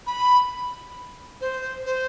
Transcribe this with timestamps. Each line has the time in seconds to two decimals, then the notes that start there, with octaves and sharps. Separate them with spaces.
0.07 B5
1.41 C5
1.86 C5